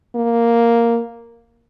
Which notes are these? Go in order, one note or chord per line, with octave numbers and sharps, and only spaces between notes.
A#3